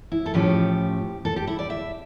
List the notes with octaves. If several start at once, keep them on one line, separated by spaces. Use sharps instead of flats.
E4
A4
A2 F3 C#4 G4
A4
G4
E4
D5
E5